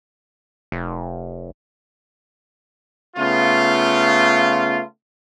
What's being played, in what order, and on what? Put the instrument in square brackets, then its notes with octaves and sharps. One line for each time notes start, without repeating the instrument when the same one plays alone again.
[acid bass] F1
[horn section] C#3 A3 B3 F4